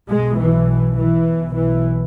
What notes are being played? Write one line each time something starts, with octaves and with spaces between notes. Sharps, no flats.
B1 B2 G#3
E3
E3
B1 B2
E3